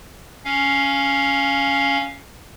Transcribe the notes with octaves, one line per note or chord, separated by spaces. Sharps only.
C#4 F5